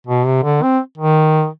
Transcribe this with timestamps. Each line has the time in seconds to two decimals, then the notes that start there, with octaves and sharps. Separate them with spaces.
0.07 B2
0.26 C3
0.44 D3
0.63 C4
0.98 D#3